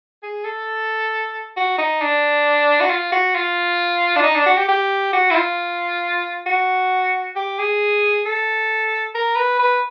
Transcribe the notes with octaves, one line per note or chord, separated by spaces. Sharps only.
G#4
A4
F#4
D#4
D4
F#4
F4
F#4
F4
D4
D#4
D4
F#4
G4
G4
F#4
E4
F4
F#4
G4
G#4
A4
A#4
B4
B4